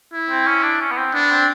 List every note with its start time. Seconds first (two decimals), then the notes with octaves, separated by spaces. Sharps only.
0.13 E4
0.30 C4
0.47 C#4
0.63 D4
0.81 C#4
0.91 B3
0.98 C4
1.14 B3 D4
1.31 C4